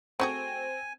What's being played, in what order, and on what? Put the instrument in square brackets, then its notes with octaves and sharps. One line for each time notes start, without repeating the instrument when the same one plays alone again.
[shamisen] A3 F#4 G#4 [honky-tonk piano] C4 [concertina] G#5